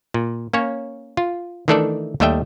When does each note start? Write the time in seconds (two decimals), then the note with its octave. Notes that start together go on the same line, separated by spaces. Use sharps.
0.14 A#2
0.53 A#3 C#4 C#5
1.17 F4
1.68 D#3 E3 A3 D4 A4 D5
2.20 D#2 G3 A3 D#5 E5 G5